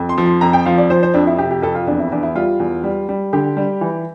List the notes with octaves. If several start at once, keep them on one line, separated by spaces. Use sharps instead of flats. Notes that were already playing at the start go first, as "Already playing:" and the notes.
Already playing: F2
C6
F3
C6
F2 A#5
G5
F3 F5
D5
F3 C5
C5
F2 D4
E4
C3 G4
G4
F2 A4
F4
E2 D4
E4
E2 D4
E4
G3 F4
E2
G3
G3
D3 G4
G3
E3